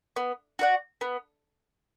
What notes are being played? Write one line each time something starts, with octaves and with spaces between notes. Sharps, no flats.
B3
F#4 D5 F#5
B3